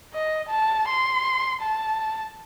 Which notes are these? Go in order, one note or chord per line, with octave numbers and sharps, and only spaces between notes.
D#5
A5
C6
A5